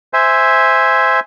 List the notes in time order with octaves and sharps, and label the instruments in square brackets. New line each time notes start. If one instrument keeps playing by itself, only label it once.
[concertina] C5 E5 G#5